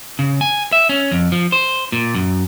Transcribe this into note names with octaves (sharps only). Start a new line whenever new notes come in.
C#3
G#5
E5
C#4
F2
F3
C5
A#2
F#2